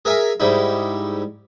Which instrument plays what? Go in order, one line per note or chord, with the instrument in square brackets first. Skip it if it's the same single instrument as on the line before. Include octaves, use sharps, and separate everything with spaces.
[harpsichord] G#4 A#4 E5 F5 G#5
G#2 G3 D#4 E4